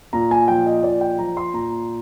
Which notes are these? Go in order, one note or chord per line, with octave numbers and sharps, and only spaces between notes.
A#2 A#5
G#5
F3 G5
D#5
A#2 D5
G5
F3 A#5
C6
A#2 A#5